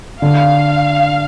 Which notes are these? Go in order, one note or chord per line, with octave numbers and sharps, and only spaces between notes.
D3 F5